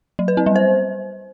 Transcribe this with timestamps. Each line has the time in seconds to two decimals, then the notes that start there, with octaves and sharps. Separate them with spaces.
0.19 F#3
0.28 B4
0.37 C4
0.46 G3
0.56 C5